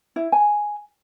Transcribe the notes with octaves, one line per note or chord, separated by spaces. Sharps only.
E4
G#5